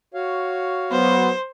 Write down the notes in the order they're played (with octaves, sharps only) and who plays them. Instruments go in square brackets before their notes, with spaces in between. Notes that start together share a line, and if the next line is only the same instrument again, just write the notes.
[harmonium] F#4 C#5 F5
[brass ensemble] F#3 B3 [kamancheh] C5